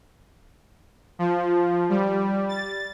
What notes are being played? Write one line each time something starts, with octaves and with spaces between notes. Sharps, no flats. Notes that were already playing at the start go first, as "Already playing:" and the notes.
F3
G3
A6